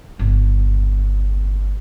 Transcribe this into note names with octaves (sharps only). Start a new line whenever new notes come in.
G1 C#2